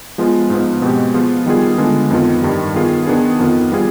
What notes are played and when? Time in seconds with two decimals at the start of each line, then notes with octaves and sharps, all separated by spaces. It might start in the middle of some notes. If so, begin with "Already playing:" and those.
0.18 F3 G#3 B3 F4
0.50 G#2 F3 B3
0.82 B2 G#3 C4 G4
1.14 F3 B3 F4 G#4
1.46 D#3 G3 B3 F4 G#4
1.78 D3 G#3 B3 F4
2.11 F2 D#3 B3 F4
2.42 G2 D#3 G3
2.74 D#3 B3 F4 G#4
3.07 D#3 B3 D4 G#4
3.39 F2 D#3 B3 F4
3.72 G3 B3 F4 G#4